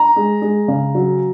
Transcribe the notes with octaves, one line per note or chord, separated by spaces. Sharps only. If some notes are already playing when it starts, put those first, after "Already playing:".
Already playing: A#5
G#3
G#3
C#3
F#3